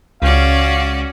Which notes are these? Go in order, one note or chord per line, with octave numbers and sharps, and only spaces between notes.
C#2 C#4 F#4 D5 F5